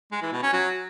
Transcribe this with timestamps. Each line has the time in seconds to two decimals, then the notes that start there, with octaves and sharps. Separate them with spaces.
0.12 G#3
0.22 E3
0.32 B2
0.42 C#4
0.53 F#3